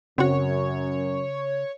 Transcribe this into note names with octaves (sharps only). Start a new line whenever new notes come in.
F#2 C#3 C4 F#4 C#5